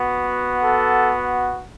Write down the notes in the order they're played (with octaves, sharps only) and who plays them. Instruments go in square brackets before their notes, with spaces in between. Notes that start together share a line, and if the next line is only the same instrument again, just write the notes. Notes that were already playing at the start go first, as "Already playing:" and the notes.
Already playing: [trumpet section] B3 F#4
A4